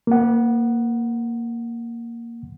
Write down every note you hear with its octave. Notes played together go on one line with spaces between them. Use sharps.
A#3 F#5